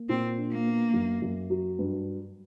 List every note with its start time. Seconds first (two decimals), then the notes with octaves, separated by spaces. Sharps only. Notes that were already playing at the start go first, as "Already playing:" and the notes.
Already playing: A#3
0.09 A#2 C4
0.38 D4
0.51 A#3
0.67 B3
0.94 F#2
1.22 F#2
1.50 F#3
1.79 G2